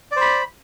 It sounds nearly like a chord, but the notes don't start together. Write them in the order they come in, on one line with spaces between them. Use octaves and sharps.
D5 C5 B5